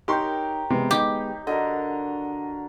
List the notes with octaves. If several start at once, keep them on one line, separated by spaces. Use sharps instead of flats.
D#4 G4 A#4 C#5 G5 C6 C#6
C3 G#3 B3
D#4 G4
D3 F#4 A#4 D#5